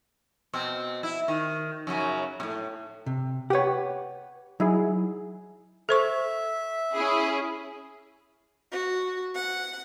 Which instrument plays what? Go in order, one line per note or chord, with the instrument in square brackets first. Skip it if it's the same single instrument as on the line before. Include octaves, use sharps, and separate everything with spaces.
[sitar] B2 C4
E4
D#3
F#2 C#3 F#3
A2 C3
[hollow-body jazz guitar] C3
[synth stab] G4 C#5 [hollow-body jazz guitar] B4 F#5
[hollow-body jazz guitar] F#3 [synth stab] D#4 E4 G#4
[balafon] A4 C5 C#6 [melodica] E5
[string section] C#4 E4 G#4
[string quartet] F#4
F#5